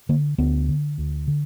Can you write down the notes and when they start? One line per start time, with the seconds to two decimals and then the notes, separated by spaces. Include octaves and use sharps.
0.09 D3 A#3
0.38 D2 B3
0.69 D3
0.98 D2
1.28 D3